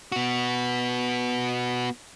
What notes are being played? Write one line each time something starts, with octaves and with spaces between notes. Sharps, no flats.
B3 F#4